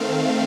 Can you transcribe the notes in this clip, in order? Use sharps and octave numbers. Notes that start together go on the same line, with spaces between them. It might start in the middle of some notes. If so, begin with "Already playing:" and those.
Already playing: D#3 A3 C4 F5